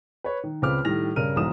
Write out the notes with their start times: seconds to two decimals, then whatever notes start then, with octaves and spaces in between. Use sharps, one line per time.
0.24 B4 C#5
0.44 D#3
0.62 C#2 C#3 C4 B4 D6 F6
0.85 A2 D#3 G3 A#6 F7
1.16 G2 C#3 A#4 F6 D#7
1.36 B1 E2 G#2 D#6 E7